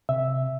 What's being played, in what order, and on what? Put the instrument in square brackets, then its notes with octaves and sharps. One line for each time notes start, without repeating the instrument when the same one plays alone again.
[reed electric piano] C3 E5